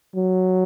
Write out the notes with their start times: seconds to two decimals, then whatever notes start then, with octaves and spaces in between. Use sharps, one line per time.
0.16 F#3